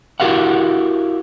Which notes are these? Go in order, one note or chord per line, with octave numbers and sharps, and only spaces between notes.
E4 F#4 G4 A#4 F5 F#5